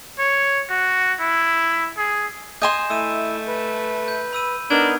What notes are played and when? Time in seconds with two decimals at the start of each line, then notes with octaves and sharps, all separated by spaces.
0.19 C#5
0.70 F#4
1.20 E4
1.98 G#4
2.62 D#5 G#5 C6 G6 E7
2.90 A3 E4 E6 D#7
3.47 B4
4.08 G6
4.33 B5 E6 D#7
4.70 B3 D4 D#4 A#4 G#6